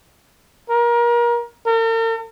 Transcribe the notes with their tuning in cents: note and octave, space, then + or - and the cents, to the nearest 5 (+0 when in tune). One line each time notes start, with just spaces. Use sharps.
A#4 +30
A#4 -45